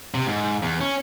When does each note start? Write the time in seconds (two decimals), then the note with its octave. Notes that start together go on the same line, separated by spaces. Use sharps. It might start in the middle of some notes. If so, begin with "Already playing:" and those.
0.15 C3
0.27 G#2
0.63 E2
0.81 C#4